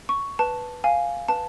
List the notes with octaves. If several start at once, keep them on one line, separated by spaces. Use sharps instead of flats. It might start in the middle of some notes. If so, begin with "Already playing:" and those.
C#6
B4 A5
F5 G#5
B4 A5